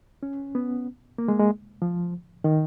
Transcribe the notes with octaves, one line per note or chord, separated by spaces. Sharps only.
C#4
B3
A#3
G#3
G#3
F3
D#3